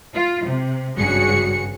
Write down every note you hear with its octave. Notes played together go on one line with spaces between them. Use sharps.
F4
C3
G#1 G2 C#3 F#4 G#4 C#7